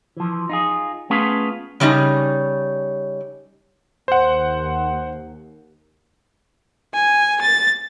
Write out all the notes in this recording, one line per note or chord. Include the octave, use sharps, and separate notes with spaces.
E3 F3
D#4 F4 G#4
A3 B3 C#4 F4 G#4 B4
C#3 G3 C#4 D#4
D#2 C5 F#5
G#5
A6